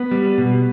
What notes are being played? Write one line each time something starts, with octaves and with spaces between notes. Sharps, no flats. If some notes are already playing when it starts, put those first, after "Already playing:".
Already playing: B3
G3
B2